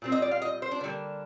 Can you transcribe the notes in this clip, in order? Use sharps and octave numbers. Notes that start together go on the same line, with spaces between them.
A#2 G3 C4
D#5
D5
F5
D#5
C5
D4
D3 G3 A#3